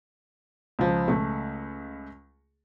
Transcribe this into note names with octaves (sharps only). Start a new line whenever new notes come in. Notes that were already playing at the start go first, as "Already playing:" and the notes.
C#2 F3
C#2 A3